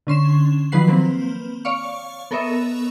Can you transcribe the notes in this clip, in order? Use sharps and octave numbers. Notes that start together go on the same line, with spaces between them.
D3 C#4 C6 E7
D#3 F3 F#3 B4 F#5 C7
A#3 C4 B4
C#5 D5 F5 C#6
B3 A4 A#4 C#5 D#5 E5